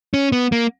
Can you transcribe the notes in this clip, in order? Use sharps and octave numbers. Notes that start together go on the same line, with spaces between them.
C#4
B3
A#3